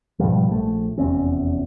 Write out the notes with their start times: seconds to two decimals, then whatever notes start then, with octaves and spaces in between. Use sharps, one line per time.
0.19 G#2 B2 F3 G3
0.48 A#1 A3
0.98 F1 E2 C4 C#4